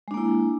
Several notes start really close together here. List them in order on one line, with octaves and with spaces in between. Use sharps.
G#3 D4 A#3 E4